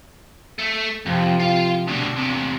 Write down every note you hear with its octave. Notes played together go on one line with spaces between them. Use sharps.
A3
F2 C3 F3
F4 F5
D2 B2 D4
E2 C3